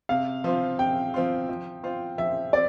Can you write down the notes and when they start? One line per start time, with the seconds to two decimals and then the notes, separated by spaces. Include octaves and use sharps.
0.09 C3 F5
0.44 F3 C4 F4
0.79 C3 G5
1.14 F3 C4 F4
1.49 F3
1.83 C4 F4 C5
2.18 F3 E5
2.53 C4 D5